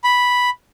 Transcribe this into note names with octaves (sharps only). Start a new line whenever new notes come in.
B5